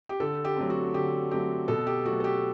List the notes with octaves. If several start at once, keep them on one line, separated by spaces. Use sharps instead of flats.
G4
D3 A4
G4
F#3 A3 C4
F#4
D3 G4
F#3 A3 C4 G4
B2 A4
G4
F#3 A3 F#4
A4
G4